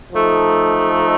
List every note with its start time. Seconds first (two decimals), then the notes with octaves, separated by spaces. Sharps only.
0.12 F3 A3 D#4 A4